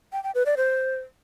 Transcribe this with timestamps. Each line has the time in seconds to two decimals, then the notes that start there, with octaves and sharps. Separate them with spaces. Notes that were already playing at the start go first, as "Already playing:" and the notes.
0.13 G5
0.24 G5
0.35 B4
0.46 D5
0.57 C5